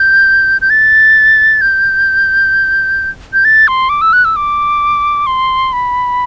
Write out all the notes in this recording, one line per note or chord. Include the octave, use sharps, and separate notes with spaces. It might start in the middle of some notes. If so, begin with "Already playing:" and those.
Already playing: G6
G6
A6
G6
G6
A6
C6
D6
E6
F#6
E6
D6
C6
B5